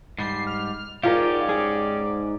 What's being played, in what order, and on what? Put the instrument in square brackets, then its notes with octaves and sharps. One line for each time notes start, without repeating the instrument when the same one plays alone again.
[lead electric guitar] G#2 G3 [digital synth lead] C7
[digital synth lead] F6
[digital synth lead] G#2 [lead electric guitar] C#4 G4 [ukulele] F4 A#4 [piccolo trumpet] D5
[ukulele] G#4